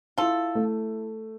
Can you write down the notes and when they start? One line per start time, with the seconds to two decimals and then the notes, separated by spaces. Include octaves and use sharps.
0.18 E4 F4 A4
0.55 A3